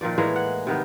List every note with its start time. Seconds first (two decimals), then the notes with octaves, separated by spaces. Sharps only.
0.01 A#2 D#3 F3 D5
0.18 A2 E3 G#3 A#3
0.36 F#5
0.67 C3 D#3 B3